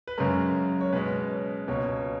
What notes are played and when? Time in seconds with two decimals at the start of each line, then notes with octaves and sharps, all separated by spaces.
0.07 B4
0.18 F#2 C#3 G#3 C#4 A#4
0.81 C#5
0.93 B2 G#3 B3 C#4 B4
1.68 C#2 B2 A#3 C#4 C#5